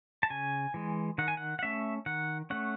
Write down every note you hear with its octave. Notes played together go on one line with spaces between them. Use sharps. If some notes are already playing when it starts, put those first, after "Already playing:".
A5
C#3 G#5
E3 G#3
D#3 F#5
G#5
F#5
F#5
A3 C#4 E5
D#3 F#5
A3 C#4 F#5